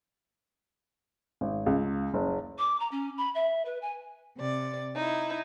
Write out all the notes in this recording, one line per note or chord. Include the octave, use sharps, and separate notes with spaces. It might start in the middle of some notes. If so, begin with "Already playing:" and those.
G#1
C#2
F#1
D6
A#5
C#4
B5
E5
B4
G#5
C3 D5
D#4 E4